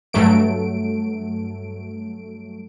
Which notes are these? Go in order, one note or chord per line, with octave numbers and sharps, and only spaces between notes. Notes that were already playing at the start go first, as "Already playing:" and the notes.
G2 F#3 A3 D7